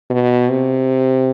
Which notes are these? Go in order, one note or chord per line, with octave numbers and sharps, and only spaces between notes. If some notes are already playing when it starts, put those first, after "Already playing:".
B2
C3